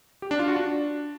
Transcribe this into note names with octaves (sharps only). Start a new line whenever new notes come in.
G4
D4
F4
F#4
D4